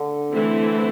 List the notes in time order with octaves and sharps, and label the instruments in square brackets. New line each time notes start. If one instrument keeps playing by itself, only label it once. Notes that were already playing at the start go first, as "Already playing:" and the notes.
Already playing: [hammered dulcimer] D3
[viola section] E3 A3 C4 E4